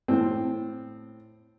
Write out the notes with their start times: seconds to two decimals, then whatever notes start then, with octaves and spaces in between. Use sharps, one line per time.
0.08 A2 C4